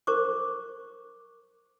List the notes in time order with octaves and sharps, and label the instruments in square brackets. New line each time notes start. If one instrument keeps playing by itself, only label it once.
[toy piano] A#4 C5 C#6 D6